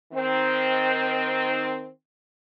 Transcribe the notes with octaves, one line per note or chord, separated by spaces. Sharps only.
D#3 C4